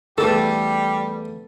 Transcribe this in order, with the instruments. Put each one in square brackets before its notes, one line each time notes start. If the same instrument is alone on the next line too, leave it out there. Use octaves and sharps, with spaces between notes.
[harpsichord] E2 D3 A3 [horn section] G3 G4 [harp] A4